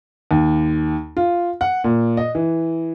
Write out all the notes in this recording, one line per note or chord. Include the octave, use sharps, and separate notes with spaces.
D#2
F4
F#5
A#2
D#5
E3